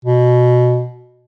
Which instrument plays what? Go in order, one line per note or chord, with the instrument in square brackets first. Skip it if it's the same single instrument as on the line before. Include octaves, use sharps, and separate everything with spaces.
[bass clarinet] B2